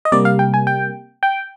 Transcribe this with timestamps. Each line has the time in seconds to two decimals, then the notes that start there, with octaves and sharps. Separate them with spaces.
0.05 D#5
0.12 C3 G3 A#3 D5
0.25 F5
0.39 G5
0.54 G#5
0.67 G5
1.23 G5